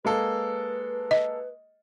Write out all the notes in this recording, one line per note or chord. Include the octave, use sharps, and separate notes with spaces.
G#3 A#3 A4 B4
D#5